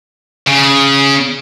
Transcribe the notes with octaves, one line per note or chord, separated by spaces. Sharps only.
C#3